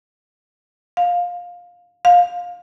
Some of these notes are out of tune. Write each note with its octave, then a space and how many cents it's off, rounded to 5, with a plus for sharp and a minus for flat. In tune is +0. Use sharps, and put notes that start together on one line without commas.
F5 +15
F5 +20